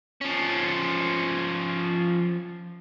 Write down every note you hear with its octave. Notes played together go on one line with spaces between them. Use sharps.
F3 C#4